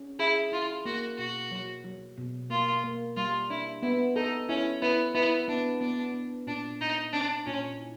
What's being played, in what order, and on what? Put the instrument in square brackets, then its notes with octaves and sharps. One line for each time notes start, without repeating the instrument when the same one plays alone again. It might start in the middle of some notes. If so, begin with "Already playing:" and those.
Already playing: [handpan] C#4
[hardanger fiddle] E4 [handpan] G#4
[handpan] E4 [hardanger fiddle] F4
[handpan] A#3 [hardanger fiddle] F#4
[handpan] B2 [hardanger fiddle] F#4
[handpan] F#3
F#3
B2
[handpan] A#3 [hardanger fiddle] F4
[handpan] A#3
[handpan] G3 [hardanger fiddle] F4
[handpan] D4 [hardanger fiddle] E4
[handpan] B3 [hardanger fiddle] E4
[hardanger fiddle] D#4 [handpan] A4
[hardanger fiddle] C#4 [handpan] E4
[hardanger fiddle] B3 [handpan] E4
[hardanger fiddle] B3 [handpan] E4
[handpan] B3 [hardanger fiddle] D4
[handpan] B3 [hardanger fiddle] D4
[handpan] B3
[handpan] A#2 [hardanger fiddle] D4
[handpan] A#2 [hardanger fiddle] D#4
[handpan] C4 [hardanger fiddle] D4
[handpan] A#2 [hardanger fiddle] C#4
[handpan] E4